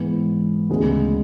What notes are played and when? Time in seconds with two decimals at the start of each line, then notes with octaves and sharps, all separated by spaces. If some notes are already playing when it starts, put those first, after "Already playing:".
Already playing: G#2 E3 B3
0.69 D2 C#3 G#3 B3